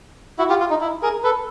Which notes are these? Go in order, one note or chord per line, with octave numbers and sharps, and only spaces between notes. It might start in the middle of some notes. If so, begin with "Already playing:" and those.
E4 F#4
F4 G4
F4
D#4
E4
G#4 A#4
A4 B4